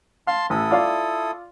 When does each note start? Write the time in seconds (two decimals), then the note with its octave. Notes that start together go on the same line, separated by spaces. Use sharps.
0.27 F5 A5 C6
0.50 A1 E4 A4 D#6
0.71 F4 D5 F5